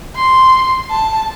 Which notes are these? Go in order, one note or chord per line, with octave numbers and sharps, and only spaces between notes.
C6
A5